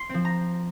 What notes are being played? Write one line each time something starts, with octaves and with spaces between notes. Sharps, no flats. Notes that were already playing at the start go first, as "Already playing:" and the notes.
Already playing: C6
F3 C4
A#5